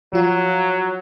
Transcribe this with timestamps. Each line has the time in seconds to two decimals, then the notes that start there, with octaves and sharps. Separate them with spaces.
0.13 F3 F#3 F4